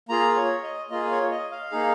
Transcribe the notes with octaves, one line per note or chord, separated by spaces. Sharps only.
A#3 F4 G#4 A#5
C#5
D#5
A#3 F4 G#4 D#5
C#5
D#5
F5
A#3 D#4 G#4